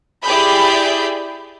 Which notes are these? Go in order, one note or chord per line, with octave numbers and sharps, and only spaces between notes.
E4 G4 G#4 D5 B5 G6